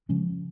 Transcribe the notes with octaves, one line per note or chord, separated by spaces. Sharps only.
C#3 F3 G#3 C#4